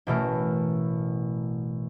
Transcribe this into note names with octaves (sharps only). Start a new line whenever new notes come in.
A1 B2 A3 A#4